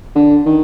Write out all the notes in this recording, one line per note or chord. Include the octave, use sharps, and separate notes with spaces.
D3
D#3